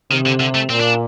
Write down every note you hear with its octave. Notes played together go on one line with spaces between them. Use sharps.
C3 D#3
D3
D3
A3
A#2 C4
D4